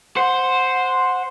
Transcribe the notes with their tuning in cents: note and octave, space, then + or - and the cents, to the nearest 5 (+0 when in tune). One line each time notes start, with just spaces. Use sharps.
C5 +0 F#5 -15